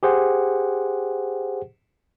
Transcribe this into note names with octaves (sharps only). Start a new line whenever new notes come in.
G4 G#4 C5 F#5